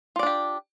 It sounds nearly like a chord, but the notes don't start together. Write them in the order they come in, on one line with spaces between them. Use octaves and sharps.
F4 D5 D4 G4